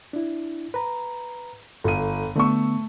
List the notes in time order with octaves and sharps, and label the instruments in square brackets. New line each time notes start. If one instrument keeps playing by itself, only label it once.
[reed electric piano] D4 E4
B4 A#5
[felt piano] G1 D#7 [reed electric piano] A4
[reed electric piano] D3 B3 E6 [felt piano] A3 C#6